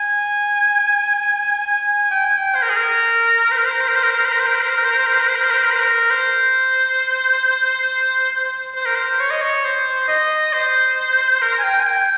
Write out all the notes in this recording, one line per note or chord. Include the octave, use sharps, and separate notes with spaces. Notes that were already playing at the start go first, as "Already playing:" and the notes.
Already playing: G#5
G#5
G5
G#5
G5
C5
A#4
G#4
A#4
A#4
C5
A#4
C5
A#4
C5
A#4
C5
A#4
C5
A#4
C5
A#4
C5
A#4
C5
A#4
C5
A#4
C5
A#4
C5
A#4
C5
A#4
C5
A#4
C5
A#4
C5
A#4
C5
A#4
C5
C5
A#4
C5
C#5
D#5
C#5
C5
D#5
C5
A#4
G#5
G5
G#5
G5